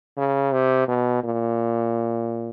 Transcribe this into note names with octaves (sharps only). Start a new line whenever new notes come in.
C#3
C3
B2
A#2